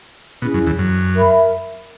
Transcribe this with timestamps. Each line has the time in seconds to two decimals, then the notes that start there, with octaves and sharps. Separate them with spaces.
0.42 B2 C#4 E4 G#4
0.54 F#2
0.67 E2
0.79 F#2
1.15 A#4 E5 B5